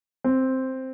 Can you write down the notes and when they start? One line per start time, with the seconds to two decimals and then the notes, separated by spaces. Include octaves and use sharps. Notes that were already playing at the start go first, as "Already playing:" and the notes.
0.24 C4